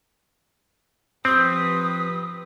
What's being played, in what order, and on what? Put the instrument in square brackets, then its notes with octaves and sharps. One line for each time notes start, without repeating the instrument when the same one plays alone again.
[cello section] F3 G4 B4 [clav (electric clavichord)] C4 [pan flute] D#6